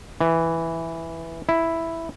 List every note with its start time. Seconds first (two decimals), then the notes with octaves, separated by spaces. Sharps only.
0.21 E3
1.49 E4